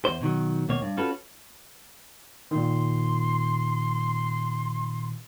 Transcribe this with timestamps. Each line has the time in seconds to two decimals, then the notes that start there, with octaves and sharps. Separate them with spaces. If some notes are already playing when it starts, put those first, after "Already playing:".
0.05 E2 C5
0.21 B2 D#3 F#3
0.69 D#2 B2 A#3 C#5
0.82 G2
0.97 C#4 F4 F#4 A4 B4
2.51 A#2 D#3 C6